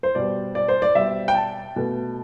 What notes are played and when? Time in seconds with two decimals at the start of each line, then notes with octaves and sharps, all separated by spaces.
0.03 C5
0.15 B2 G3 D5
0.55 D5
0.68 C5
0.82 D5
0.95 B2 G3 E5
1.28 G5
1.35 A5
1.76 B2 A3